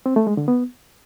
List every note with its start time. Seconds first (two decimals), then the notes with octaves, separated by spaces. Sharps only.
0.06 C4
0.16 A3
0.27 G#3
0.37 D3
0.48 B3